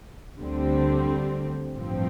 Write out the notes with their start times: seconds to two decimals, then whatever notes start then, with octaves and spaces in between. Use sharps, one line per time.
0.39 D2 D3 G3 C4
1.76 A1 G2 F3 C4